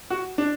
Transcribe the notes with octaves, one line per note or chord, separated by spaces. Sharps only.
F#4
D4